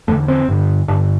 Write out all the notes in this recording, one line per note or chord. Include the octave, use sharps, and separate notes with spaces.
E2 D3 A3
C4
G2 D3
G2 D3 D4